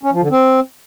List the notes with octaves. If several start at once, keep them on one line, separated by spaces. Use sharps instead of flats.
C#4
F3
D3
C4